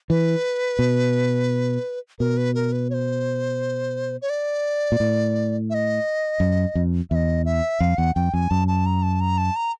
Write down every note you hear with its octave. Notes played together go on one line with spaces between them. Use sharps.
E3 B4
B2
B2 A#4
B4
A#4
B4
C#5
C5
C#5
D5
A#2
A2
E5
D#5
F#2
F2
E2 D#5 E5
E5
F2 F5
E2 F#5
F2 G5
F2 G#5
F#2 A5
A5
A#5
A5
A#5
A5
A#5